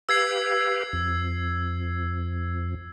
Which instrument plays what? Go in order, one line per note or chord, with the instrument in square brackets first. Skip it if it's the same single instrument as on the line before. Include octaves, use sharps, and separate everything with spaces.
[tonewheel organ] G4 B4 F5 [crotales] E6 G#6 C7
[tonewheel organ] F2